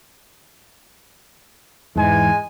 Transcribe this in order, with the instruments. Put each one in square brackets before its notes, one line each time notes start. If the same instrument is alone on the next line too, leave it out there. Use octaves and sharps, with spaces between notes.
[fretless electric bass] E2 G#2 E3 [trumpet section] G#3 G#5